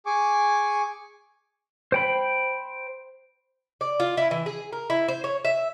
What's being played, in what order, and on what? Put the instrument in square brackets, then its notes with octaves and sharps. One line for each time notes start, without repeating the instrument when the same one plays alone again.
[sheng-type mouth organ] G#4 G#5 C#6 D6
[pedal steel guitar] C5 G5 B5
[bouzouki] D5
F4
E4
E3
G#4
A#4
E4
C5
C#5
E5